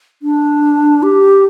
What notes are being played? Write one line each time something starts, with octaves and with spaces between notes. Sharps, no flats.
D4
G4